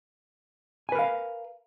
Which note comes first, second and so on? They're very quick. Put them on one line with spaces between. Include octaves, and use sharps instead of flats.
G#5 B4 A#4 F5